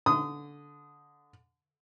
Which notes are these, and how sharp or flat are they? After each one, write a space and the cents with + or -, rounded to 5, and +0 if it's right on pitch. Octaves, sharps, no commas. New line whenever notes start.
D3 -15 C6 -40 D#6 +0